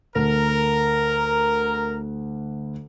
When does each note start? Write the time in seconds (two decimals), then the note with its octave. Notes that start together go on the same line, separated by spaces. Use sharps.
0.15 D2 A#4